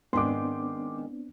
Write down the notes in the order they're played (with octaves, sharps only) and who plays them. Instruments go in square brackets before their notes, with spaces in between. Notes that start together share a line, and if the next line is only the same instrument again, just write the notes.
[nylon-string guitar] G#2 D#3 [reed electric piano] B3 C4 D4 [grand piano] C6 D6